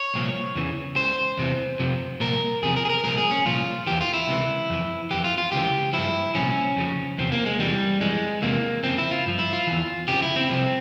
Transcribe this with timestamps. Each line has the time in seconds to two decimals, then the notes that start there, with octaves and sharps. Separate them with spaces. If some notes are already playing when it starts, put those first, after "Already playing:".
Already playing: C#5
0.14 C2 A#2 F3
0.55 E2 C#3 E3
0.96 C#2 C#3 C5
1.38 E2 C3 E3
1.79 F2 C3 F3
2.20 C2 A#2 F3 A#4
2.62 E2 C3 F3 G#4
2.77 A#4
2.85 G#4
2.90 A#4
3.04 C2 A#2 F3 A#4
3.18 G#4
3.31 C#4
3.45 C2 A#2 F3 F4
3.87 E2 E3 G4
4.01 F4
4.14 E4
4.28 C#2 C3 E3
4.70 F2 E3
5.11 F2 E3 G4
5.24 F4
5.38 F4
5.52 C#2 C#3 E3 G4
5.93 G2 F3 E4
6.35 C2 A#2 F3 C#4
6.76 F2 C#3 F3
7.18 E2 C3 F3 C4
7.32 A#3
7.46 G#3
7.59 E2 C3 E3 G3
8.01 F2 E3 G#3
8.42 E2 C3 E3 A#3
8.83 F2 C#3 F3 C4
8.98 E4
9.11 F4
9.26 G2 F3
9.39 E4
9.53 F4
9.67 E2 E3
10.08 F2 C#3 F3 G4
10.22 E4
10.36 C4
10.50 C2 C3 F3